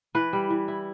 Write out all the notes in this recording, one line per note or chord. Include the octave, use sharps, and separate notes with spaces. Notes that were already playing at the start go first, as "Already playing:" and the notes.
E3 B4
G3
E3
E4